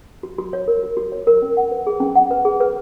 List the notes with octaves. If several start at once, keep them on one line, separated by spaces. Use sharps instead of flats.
F#4
F#4
C#5
A#4
F#4
F#4
C#5
A#4
C#4
F#5
B4
G#4
C#4
F#5
B4
G#4
B4